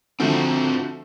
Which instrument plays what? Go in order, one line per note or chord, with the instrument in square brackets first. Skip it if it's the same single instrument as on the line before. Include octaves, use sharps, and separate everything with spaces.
[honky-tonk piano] D3 F3 A3 [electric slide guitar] C4 F#4